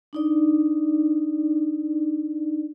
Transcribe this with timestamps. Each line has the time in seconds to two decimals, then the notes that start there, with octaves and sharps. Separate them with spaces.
0.13 D4 D#4 D5